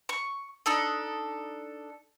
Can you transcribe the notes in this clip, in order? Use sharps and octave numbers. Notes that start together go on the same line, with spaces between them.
C#6
D4 D#4 A4